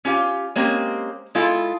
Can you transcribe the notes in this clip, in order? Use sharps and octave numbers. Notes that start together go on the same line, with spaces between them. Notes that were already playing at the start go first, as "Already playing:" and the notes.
C#4 F4 G4 F5 G#5
G#3 A#3 C4 C#4 G4
G#3 E4 F4 A4